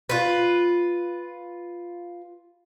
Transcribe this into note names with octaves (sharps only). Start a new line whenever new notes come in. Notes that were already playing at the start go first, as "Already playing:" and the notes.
F4 B4